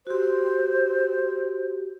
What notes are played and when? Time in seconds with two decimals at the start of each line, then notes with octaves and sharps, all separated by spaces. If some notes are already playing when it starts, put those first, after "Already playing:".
0.07 F#4 G4 C5